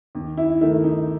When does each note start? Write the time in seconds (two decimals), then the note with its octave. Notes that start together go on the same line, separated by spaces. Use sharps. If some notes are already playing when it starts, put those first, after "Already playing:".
0.15 D#2
0.37 E4
0.61 D#3 A3 E4
0.84 D#4